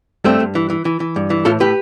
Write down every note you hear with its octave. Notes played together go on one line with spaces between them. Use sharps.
G2 A3 C4
G2
E3
E3
E3
E3
G2
E3
A2 F4 A4
A2 G4 B4